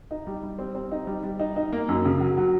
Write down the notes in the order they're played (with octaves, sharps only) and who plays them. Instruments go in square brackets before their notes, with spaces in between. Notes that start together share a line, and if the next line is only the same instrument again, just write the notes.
[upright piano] D#4
G3
G3
C4
C4
D#4
G3
G3
D#4
D#4
A#3
F#2
C#3
F#3
F#3